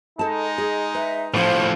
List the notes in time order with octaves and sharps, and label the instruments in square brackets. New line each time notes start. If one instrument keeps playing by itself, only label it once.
[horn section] G#3 D#4 [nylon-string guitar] A4 A5
[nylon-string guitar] G#4
[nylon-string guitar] B4 [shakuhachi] E5
[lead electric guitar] A2 F3 [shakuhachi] C5